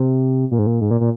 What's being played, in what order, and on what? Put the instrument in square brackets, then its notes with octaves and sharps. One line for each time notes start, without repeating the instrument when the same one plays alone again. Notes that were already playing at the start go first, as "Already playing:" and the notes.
Already playing: [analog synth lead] C3
A#2
G#2
A#2
G#2
A#2
A#2